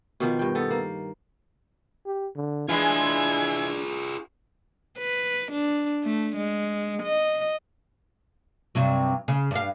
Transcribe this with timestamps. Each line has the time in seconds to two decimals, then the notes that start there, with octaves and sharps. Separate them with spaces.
0.20 B2 D#3 F3
0.39 G2 G5
0.55 B3 A4
0.70 A#3
2.06 G4
2.36 D3
2.69 E3 G#3 D4 E4 F4 G#4 G#6
4.98 B4
5.52 D4
6.04 A3
6.36 G#3
7.03 D#5
8.75 G2 C3 F#3
9.28 C#3
9.51 G2 F5